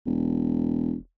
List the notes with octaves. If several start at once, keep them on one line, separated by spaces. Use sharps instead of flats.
E1